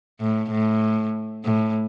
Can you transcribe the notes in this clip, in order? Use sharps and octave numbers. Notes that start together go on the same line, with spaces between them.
A2
A2
A2